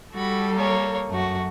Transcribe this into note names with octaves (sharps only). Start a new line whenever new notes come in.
G3 F#4 A4 B5
A#3 C#5
F#2 A3 F#4